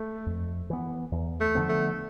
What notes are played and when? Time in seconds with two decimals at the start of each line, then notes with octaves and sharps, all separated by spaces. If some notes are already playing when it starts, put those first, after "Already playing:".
Already playing: A3
0.26 F2
0.70 E3 B3
1.12 E2
1.41 A3
1.55 D3 F3 B3
1.69 A3